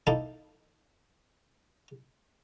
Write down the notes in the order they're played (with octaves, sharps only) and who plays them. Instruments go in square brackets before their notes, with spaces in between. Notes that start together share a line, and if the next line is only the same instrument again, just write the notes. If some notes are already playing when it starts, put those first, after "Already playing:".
[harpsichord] A#3 D#4 E4 A4 E5 F5